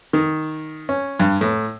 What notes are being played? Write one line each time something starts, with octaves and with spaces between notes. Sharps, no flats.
D#3
C#4
G2
A2